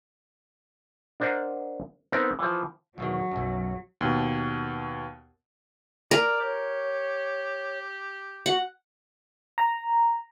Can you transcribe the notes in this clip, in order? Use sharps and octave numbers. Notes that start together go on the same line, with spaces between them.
D4 A#4 C5 D#5 F#5 A#5
B3 C4 D#4 A#4
E3 F3
E2 B2 D#3 F#3
B1 F#2
D#2 B2
A#4 D5
G4 C#5
F#4 F#5
A#5